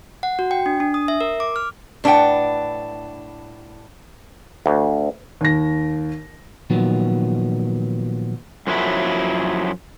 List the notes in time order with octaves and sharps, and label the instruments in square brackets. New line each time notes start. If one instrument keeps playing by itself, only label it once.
[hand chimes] F#5
F#4
G5
D4
D4
D#6
E5
A#4
D6
F6
[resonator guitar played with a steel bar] A2 D4 B4 F#5 G5
[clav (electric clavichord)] D2
[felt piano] D#2 A#6
[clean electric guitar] A#2 D#3 F3 F#3 B3
[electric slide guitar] F#2 F3 F#3 E4